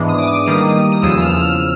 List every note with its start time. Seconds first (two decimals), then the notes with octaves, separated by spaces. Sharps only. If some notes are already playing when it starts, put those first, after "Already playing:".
Already playing: G#2 E3 G#3 B3 D4
0.08 D#6
0.18 D6
0.46 D#3 G3 A#3 D#6
0.92 D#6
1.02 E2 C#3 F3 E6
1.21 F6